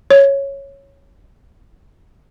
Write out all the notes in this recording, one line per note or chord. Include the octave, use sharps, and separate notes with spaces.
C#5